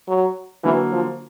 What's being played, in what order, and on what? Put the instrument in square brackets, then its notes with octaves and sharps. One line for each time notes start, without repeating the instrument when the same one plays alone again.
[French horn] F#3
[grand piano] D3 F#3 A#3 [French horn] E3
[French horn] F3